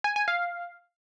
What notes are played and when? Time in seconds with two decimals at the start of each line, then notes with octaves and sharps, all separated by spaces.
0.04 G#5
0.16 G#5
0.28 F5